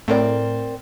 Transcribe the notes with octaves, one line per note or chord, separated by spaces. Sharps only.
A2 C4 A#4 D5